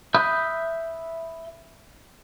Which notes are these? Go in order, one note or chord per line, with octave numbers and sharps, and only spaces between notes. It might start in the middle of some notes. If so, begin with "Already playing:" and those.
E5 B5 D#6 F#6 G6